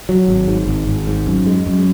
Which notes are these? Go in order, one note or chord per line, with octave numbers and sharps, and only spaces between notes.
F#3
G#1
G#2
G#1
G#1
G#2
F#2
G#3
F#2